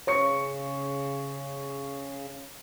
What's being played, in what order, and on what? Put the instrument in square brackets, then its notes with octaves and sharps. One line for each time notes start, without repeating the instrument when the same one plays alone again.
[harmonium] C#3 [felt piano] C#5 C#6 C#7